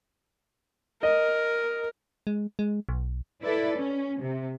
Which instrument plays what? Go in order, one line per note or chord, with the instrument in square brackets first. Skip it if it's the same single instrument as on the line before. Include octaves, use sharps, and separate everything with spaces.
[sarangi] A#4 [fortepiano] D#5
[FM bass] G#3
G#3
B1
[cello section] E4 A4 B4 D5
C#4
C3